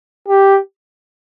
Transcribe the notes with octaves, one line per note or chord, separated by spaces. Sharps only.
G4